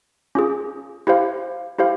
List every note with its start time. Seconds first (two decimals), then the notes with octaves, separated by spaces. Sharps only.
0.35 C#4 F4 G#4
1.07 E4 G4 C5 F5
1.79 E4 G4 C5 F5